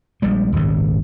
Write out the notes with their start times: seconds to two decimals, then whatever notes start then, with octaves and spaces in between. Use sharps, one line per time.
0.22 A#1 G3 G#3
0.53 D#1 G#1 C#2 G2